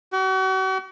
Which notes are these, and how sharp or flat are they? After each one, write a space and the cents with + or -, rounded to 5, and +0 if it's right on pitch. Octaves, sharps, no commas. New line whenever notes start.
F#4 +40